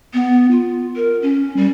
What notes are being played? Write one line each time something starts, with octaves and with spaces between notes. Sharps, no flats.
B3
F4
A#4
C#4
G3